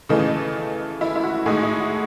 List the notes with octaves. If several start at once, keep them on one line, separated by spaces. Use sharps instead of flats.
C#3 E3 A3 D#5
E4
E4
F#4
A2 G#3 D#4 G#4
E4
F#4